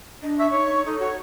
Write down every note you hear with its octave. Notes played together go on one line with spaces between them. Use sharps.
D4 D#5
E5 C#6
D#4 C#5
D#4 A4
F#4 C#5